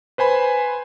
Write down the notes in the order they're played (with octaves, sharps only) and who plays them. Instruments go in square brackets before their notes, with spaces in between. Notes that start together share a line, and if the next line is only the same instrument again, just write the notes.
[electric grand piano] B4 C5 G#5 B5